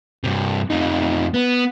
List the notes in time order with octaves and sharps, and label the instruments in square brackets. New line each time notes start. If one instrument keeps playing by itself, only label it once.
[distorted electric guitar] G2 C3
F2 D#4
B3